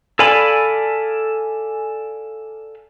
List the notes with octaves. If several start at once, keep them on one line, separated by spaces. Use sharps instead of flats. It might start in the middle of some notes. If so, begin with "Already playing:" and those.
A4 D5 F5 G#5 B5